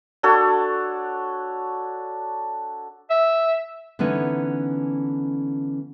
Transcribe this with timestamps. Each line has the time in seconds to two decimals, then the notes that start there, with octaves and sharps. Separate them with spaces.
0.23 D4 F#4 A4 C#5
3.10 E5
3.99 D3 E3 B3 C#4 D#4